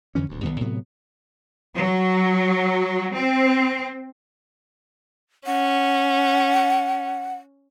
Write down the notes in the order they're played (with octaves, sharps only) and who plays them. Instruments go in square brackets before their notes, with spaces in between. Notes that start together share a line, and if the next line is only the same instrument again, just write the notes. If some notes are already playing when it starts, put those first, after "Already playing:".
[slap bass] F2 D3 E3 C#4
D#1 D2
B1 G2 D#3 B3
A2 C3 F#3 B3
[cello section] F#3
C4
[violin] C#4 [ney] F#5